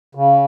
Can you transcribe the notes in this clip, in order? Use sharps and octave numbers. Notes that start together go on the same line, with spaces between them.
C#3